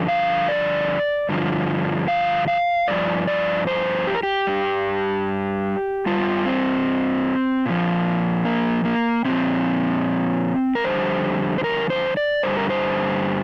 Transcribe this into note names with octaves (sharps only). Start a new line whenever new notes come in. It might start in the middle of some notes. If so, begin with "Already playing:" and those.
Already playing: G2 D3 F3
F5
D5
G2 D3 F3
F5
F5
G2 F3 D5
D5
C5
G4
A#4
G4
G2 G3
G2 G3 F4
C4
A#2 F3
A#3
A#3
A#2 F3 C4
A#4
F2 D3 G3 C5
C5
A#4
C5
D5
G2 D3 G3 C5
A#4
C5